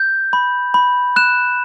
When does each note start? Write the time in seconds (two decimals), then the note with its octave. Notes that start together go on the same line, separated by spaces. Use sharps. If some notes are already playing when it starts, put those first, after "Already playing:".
Already playing: G6
0.33 B5
0.74 B5
1.16 F#6 E7